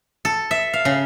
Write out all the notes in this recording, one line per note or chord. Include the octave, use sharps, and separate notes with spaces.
A4
E5
F5
C#3